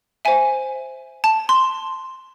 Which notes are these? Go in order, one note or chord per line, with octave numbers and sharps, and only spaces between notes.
C5 E5 G#5
A5
C6